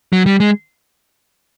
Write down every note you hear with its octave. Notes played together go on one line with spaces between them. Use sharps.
F#3
G3
G#3